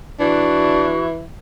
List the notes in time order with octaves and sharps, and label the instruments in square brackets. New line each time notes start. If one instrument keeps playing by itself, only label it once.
[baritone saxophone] E3 [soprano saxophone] D4 [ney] F#4